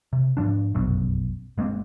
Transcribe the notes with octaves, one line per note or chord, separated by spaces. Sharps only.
C3
G#2 F3 D4
F1 A#1 F#2 B2
G1 G#3 A#3 C4